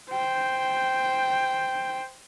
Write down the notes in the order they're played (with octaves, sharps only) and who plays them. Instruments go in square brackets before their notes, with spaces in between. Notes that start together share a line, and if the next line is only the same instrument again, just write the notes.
[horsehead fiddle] C5 G5